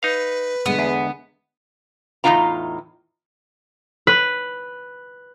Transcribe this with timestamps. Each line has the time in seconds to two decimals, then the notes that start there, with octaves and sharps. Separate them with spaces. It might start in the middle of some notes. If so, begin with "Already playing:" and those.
0.03 D#4 B4 F5
0.66 D3 G#3 B3
0.79 E2
2.24 E2 A2 C#3 D#4 F4 A#5
4.07 B4